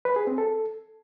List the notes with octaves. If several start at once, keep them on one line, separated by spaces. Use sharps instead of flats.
B4
G#4
C4
A4